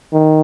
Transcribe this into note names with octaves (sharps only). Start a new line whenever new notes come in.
D#3